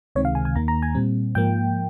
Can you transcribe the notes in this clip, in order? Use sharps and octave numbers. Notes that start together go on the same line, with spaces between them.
C#2 C3 D#3 G#3 C4 C#5
F5
G#5
G#5
D#2 D#3 A#3 A#5
A#5
G#5
A#2 G3 C4
G#2 F3 A#3 G5